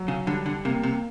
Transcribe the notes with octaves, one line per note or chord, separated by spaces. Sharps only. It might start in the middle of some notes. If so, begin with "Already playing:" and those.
Already playing: F#3
C#3
D3 G3
D3
C3 A#3
C3